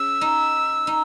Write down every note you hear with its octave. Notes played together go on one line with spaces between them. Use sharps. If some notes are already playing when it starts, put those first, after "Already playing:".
Already playing: C#4 G#4 E6
D#4
D#4